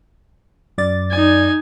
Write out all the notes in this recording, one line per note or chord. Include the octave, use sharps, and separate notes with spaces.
F#2 D5 A6
D#4 G#5